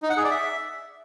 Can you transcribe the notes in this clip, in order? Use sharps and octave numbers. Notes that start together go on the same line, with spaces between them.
D#4
F#5
G#4
D5
E5